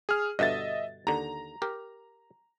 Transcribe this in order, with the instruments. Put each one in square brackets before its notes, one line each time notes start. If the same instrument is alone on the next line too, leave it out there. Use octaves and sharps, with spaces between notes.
[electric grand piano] G#4 F6
[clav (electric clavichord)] G2 B2 D3 [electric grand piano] D#5 E5 A6
[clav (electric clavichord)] D#2 D3 [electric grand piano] A#5
[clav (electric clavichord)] G4 A#4